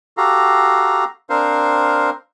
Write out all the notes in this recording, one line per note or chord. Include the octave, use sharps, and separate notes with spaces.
F#4 G4 A4 F5 A#5
C4 D4 A#4 C5 F5